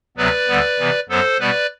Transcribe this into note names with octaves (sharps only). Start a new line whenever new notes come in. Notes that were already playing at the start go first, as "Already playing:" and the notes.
D2 C3 F#3 B3 B4 D5
D2 D3 G3 B3
C3 E3 B3
F#2 F#3 B3 A4 C5
B2 G3 B3 B4 D5